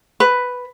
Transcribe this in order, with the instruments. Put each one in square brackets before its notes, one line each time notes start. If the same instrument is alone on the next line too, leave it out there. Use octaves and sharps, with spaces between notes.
[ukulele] B4